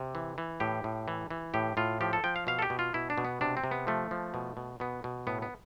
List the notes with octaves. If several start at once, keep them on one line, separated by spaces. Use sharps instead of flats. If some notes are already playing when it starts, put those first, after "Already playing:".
Already playing: C3
E3
E3
A2 G4
A2
E3
E3
A2 G4
A2 F4
F3 G4
A4
F3 G5
F5
B2 F5
A4
G4
B2
F4
B2 E4
D4
B2
B3
C3 D4
C4
C3
B3
F3 A3
F3
B2
B2
B2 B3
B2
A2 B3
B3